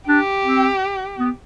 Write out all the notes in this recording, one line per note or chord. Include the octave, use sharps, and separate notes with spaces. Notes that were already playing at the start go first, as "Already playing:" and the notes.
D4 G4
C4
B3